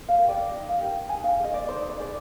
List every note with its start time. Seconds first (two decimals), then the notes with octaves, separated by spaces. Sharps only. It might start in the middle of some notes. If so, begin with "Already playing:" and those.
0.09 F5
0.19 G4 A#4
0.29 D5
0.48 D#4 D#5
0.69 F5
0.78 G4 A#4
1.09 D#4 G#5
1.24 F5
1.39 G#4 D#5
1.54 D5
1.69 D#4 C5
1.89 D5
1.99 G#4 D5